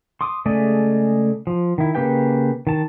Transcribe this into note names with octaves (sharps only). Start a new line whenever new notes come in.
C6 D6 D#6
C#3 G#3 A3 D5 D#5
F3
D#3 E4
C#3 A#3 G4 B4 G5
D#3 A5